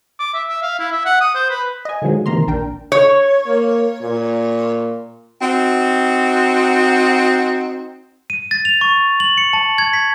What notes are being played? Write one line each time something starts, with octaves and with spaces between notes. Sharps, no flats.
D6
E5
E5
F5
E4
E5
F#5
D#6
C5
B4
D#5 G#5
D3 D#3 F3 F#3 G#3
C3 D#3 E3 A#3 A#5 C6
A#1 D4 A#4 G5
C#5
A#3
A#2
C4 D#4 F#4
D#7
A6
F7
C#6
F#7
C#7
A5
G#6
B6